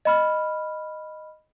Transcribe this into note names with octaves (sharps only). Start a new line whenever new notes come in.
D#5 B5 F6